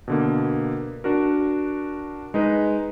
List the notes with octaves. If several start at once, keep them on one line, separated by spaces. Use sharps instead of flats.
B2 D3 A#3
D4 F#4 A#4
G#3 D#4 B4